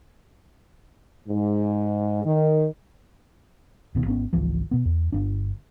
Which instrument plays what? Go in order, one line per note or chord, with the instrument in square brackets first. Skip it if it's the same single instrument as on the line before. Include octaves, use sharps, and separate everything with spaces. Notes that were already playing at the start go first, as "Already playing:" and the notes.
[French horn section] G#2
D#3
[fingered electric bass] D1 B2 D#3
G#1 B3 C#4
G#1 C#2 E3 F3
B2 B3
E2
G1 D4